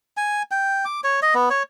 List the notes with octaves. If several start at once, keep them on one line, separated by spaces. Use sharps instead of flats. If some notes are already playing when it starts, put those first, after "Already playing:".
G#5
G5
D6
C#5
D#5
B3
C#5